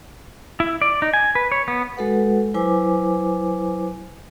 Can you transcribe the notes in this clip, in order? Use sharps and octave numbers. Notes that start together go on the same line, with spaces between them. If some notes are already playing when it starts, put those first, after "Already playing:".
E4
D5
D#4
G#5
B4
C#5
B3
G#3 F#4 A4 B4 F#5
F#3 E4 B4 C5 G#5 D6